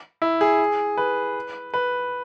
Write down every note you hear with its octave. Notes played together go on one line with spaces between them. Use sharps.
E4
G#4
B4
B4